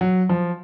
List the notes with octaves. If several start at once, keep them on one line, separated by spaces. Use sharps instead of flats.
F#3
F3